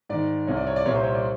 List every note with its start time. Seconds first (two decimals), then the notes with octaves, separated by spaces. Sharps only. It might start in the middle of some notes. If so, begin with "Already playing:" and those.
0.09 G#2 D#3 D5
0.47 C2 C3 F3 C#5
0.57 D5
0.67 C#5
0.76 D5
0.86 C2 A#2 F3 C#5
0.95 C5
1.04 C#5
1.15 D5